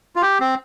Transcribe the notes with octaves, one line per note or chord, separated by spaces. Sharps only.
F4
G4
C4